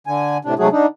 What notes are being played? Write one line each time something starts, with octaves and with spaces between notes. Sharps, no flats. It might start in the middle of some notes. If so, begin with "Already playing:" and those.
D3 G#5
A2 C3 D4
G#2 C3 F#3 A3 F#4 G#4
D3 D4 D#4